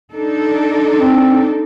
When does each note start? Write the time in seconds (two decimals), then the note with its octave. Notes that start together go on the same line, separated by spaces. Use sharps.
0.12 D4 D#4 A4
0.97 C4